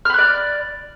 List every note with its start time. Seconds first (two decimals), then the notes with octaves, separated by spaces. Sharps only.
0.05 F6
0.10 B5
0.14 F#6
0.18 D5